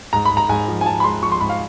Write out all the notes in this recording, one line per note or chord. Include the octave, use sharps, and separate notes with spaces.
G#2 A#5
B5
G#2
A#5
G#2 G#5
F3
G#5
F3 A5
B5
G#3 C6
F3 C#6
C6
G#2 B5
F5